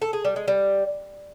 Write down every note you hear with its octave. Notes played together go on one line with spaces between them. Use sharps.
A4
G#4
G3
G#3
G3